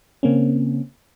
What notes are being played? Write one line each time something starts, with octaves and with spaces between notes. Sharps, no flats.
C#3 A#3 C4 C#4